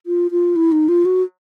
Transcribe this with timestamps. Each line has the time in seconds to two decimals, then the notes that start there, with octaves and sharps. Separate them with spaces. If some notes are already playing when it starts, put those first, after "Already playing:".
0.06 F4
0.31 F4
0.56 E4
0.72 D#4
0.89 F4
1.05 F#4